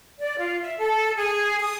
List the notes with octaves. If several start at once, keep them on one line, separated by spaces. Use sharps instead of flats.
D5
F4
E5
A4
G#4
D#6